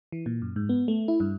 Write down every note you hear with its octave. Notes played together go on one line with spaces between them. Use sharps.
E3
A#2
F#2
G#2
B3
A3
E4
G2